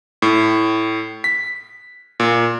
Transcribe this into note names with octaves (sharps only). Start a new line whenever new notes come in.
A2
B6
A#2